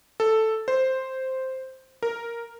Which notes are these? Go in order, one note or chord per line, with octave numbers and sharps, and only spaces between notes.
A4
C5
A#4